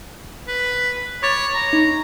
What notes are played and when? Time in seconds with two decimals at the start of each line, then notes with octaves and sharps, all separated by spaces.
0.48 B4
1.23 C#5 B5 D6 A6
1.55 A#5
1.73 D#4